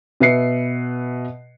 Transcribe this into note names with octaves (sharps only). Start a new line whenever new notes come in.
B2 B4 E5 C7 C#7